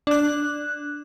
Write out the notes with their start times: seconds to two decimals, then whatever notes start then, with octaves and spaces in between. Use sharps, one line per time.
0.07 D4 F#6